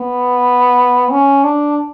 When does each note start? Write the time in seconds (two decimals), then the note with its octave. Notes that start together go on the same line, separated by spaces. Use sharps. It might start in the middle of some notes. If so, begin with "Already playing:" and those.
Already playing: B3
1.12 C#4
1.44 D4